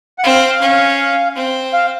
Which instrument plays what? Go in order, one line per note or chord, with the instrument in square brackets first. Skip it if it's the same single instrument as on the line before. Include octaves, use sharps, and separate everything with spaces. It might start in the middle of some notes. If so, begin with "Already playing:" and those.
[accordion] F#5
[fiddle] C4 [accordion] F5
[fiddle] C#4
C4
[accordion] F5